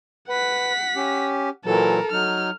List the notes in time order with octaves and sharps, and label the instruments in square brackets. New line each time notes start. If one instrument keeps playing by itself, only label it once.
[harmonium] B4 [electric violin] F#5 B6
[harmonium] C#4 G4
[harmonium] A#2 E3 F#3 [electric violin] A4 A#4
[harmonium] F#3 D#4 [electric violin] F6